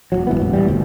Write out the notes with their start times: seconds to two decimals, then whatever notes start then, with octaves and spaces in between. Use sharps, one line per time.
0.12 E1 B1 F#3
0.27 G#1 E3 B3
0.40 E1 A1
0.53 D#1 A#1 E3 G3
0.68 G1 D2